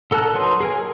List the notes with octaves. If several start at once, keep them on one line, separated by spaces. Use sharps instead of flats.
D3 A4 A#4 A5 F#6
F#3 D#4 B4 C#5 C6
G#4 A#4 G#5